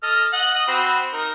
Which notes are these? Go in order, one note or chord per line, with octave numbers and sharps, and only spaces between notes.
A4 D#5 F6
D#5 F#5
D#5
C4 F#4 B5
D#4 A#4